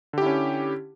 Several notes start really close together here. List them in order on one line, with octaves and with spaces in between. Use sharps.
D3 G4 E4 C#4